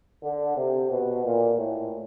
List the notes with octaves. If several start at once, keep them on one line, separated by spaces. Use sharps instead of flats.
D3
C3
B2
A#2
A2